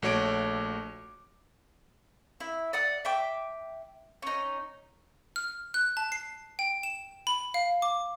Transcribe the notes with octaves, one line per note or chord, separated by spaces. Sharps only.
A#1 A3 F#4 C#5 D6 D7
E4
D5 F#5 D#6
E5 G5 D6
C#4 D#4
F6
F#6
A5
C7
G5
E7
B5
F5
D6